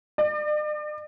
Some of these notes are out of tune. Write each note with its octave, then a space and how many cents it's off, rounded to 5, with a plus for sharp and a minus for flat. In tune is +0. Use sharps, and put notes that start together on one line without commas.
D5 +40